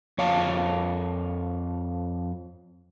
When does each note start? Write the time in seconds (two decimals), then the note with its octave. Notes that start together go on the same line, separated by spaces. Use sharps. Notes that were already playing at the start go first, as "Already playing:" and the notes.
0.18 F2 C#5 F5 A5